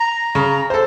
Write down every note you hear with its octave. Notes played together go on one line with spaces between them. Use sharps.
A#5
C#3
A4 C5